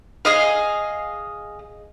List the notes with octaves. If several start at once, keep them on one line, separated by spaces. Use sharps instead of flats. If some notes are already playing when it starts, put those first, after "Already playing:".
G#4 D#5 F5